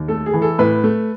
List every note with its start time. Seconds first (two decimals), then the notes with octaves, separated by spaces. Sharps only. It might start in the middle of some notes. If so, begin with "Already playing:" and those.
Already playing: D#2
0.08 A3 A4
0.26 G#4
0.33 E3
0.42 A4
0.59 A2 B4
0.84 A3